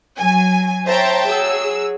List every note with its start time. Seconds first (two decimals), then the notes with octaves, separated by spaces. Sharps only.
0.19 F#3 G#5
0.87 C5 C#5 E5 G5 A5 A#5
1.28 F#3 G#4 E6